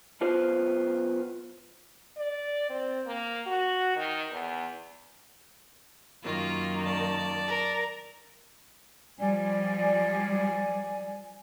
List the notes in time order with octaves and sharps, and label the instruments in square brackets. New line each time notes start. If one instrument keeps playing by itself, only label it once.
[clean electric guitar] F#2 B3 F4 C5
[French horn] D5
C4
A#3
F#4
D#3
E2
[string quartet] F#2 D#3 A#3 [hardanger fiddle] F4
[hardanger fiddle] D5 A5
[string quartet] A#4
[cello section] F3 G3 [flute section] D5 G#5